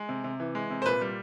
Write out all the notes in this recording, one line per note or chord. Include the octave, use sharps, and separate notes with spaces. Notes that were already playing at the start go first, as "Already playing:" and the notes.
Already playing: G#3
C3
C3
E3
G#3
C3
C5
A#2 B4
G3